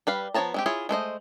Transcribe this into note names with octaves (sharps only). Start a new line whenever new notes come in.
G3 B4 F5
F3 B3 C#5 A5 A#5
G#3 C4 G4
E4 F4 G#4 C#5
G#3 A3 C5 D#5